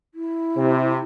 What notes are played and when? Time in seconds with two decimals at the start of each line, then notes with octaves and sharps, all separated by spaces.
0.15 E4
0.57 C3